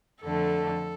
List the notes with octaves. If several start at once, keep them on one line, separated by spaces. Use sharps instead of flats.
F2 D3 A3 A4